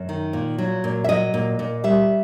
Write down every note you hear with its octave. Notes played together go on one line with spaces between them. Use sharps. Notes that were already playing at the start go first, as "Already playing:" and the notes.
Already playing: F#2
D#3
A#2
F#3
A#2
E5
F#3 D#5
A#2
A#2
G3 E5